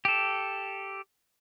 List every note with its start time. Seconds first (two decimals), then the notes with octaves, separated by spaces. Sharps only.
0.05 G4 A4